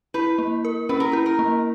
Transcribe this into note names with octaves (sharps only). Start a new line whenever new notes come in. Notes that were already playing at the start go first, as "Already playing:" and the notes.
E4 B4
A#3
A#4
C#4 B4
A#4
E4 B4
A#4
A#3